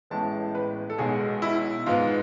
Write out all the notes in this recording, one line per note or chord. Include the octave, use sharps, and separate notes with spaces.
A1 A2 G#3 B3 A5
B4
A4
B1 B2 G#3 G#4
E4
G#2 G#3 B3 F4